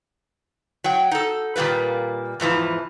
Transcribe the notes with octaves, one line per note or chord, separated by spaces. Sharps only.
F#3 G5
D#4 A4
A#2 D#3 G3 A#3 B4
E2 G#2 E3 F3